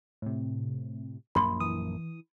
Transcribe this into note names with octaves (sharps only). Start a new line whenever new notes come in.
A2 C3
A#1 F#2 A#3 B5 C6
E3 D#6